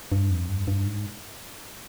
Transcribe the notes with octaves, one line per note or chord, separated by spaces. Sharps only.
G2
F2
G2
G2
G#2